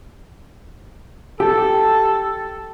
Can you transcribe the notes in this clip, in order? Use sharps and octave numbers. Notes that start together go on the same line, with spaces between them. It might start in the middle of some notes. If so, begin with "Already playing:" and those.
G4 A4